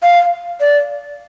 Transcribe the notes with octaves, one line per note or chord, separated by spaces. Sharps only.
F5
D5